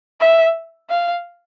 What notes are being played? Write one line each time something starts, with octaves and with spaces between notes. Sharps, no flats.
E5
F5